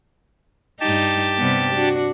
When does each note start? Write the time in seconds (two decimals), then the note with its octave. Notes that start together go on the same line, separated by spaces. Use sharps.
0.80 G2 D#4 G4 A5
1.38 C3 G3 B3
1.73 D4 F#4